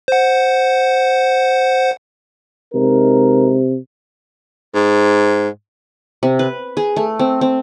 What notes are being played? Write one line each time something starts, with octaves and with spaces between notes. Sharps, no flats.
C5 F#5
C3 G#3 D#4 A#4
G#2
C3
B4
G#4
A3
C4
C4